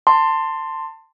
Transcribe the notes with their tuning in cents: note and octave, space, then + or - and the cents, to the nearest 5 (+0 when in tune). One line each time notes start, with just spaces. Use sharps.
A5 +25 C6 +0